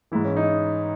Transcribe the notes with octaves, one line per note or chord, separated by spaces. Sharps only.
G#2 E3 E4
C#4
D#4